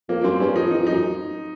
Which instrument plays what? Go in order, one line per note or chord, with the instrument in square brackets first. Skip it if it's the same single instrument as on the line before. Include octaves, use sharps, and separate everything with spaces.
[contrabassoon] F2 [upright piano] A#3
[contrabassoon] F#2 [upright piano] C4
[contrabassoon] G2 [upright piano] C#4
[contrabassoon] F2 [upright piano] D#4
[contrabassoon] E2 [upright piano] D#4
[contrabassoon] F2
[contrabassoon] F#2 [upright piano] D#4